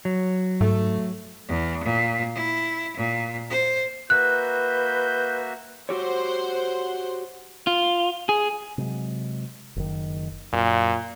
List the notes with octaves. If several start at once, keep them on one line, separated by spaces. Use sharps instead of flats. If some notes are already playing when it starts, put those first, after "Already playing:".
F#3
G#2 A3
E2
A#2
E4
A#2
C5
A#3 F#4 B4 E5 F#6 G6
F#4 G4 C5 C#5 F#5 C6
F4
G#4
C3 F#3 G#3
F#1 D#3
F#2 A#2